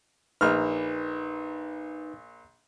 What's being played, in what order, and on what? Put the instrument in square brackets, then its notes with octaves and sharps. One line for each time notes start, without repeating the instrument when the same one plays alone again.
[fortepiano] A#1 F6 [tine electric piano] D#4 B4